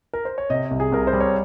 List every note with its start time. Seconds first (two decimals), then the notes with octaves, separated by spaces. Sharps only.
0.14 A#4
0.25 C5
0.38 C#5
0.50 C3 D#5
0.71 C2
0.80 G#4
0.92 C2 A#4
1.07 C5
1.13 G3
1.20 C#5